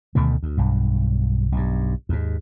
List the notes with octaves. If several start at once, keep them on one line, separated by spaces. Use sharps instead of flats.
D2 B2 D#3 A3
D2
B1 G2
B1 G2
D#2 G#2